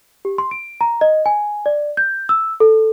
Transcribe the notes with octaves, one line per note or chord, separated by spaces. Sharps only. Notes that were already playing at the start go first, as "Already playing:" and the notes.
G4
C6
D7
A#5
D#5
G#5
D5
G6
E6
A4